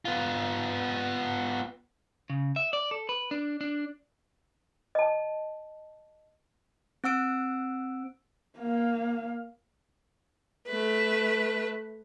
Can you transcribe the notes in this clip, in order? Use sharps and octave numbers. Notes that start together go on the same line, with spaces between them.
B3 F4
C#3
E5
D5
A4
B4
D4
D4
D#5 A5
C4 F#5 E6 D7
A#3 F5
A3 B4